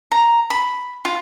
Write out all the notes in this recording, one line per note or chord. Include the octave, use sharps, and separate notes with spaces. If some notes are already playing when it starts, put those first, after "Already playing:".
A#5
B5
F4